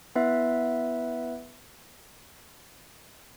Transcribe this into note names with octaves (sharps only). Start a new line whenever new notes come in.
B3 E4 B4 E5